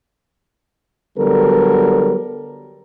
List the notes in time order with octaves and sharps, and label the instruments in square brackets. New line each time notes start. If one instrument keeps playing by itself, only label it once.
[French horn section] D3 F#3 G3 B3 A4 A#4